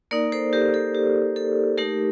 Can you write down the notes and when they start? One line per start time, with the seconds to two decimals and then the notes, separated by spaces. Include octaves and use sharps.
0.11 A#3 D#4 A#4 D5
0.32 A4 C5
0.53 G4 A#4
0.74 A4
0.95 G4
1.36 A4
1.78 A3 D#4 G4 A#4